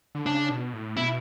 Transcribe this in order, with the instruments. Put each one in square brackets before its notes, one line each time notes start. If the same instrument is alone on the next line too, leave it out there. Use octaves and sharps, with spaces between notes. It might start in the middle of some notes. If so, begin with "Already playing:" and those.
[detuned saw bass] D3
[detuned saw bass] C#3 [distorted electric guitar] D4
[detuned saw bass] B2
A2
[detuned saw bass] B2 [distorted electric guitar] E4